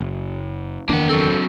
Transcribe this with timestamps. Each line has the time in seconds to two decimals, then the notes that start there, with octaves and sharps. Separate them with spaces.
0.01 F#1
0.89 F#1 E2 D#3 A#3 D4 F#5
1.09 F#3 C4 A4